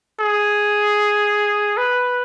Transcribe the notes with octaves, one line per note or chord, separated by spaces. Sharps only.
G#4
B4